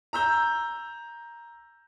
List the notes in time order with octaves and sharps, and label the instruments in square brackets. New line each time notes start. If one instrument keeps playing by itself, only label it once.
[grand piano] A#5 E6 G6